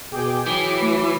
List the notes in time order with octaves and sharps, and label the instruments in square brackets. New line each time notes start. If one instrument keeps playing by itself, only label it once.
[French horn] B2 [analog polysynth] G#4 G5 D6
[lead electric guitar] E3 [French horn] F#3
[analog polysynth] A3